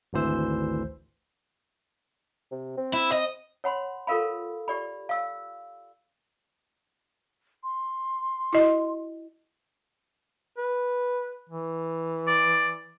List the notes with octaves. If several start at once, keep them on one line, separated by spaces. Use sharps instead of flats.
G#1 D2 E3 C5 E6
C3
C4
E4
D#5
C#5 F#5 B5 C6
F4 A4 A#4 F5 B5
G4 D5 B5
F5 E6
C6
E4 F#4 D#5
B4
E3
D5